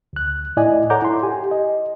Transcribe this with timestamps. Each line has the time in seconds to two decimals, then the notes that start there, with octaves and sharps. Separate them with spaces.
0.13 D2 F#6
0.57 A2 E4 D5 D#5 G#5
0.90 A4 C#5 F#5 A#5 D6 G6
1.02 E4 C6
1.23 G4 G#5
1.51 D#5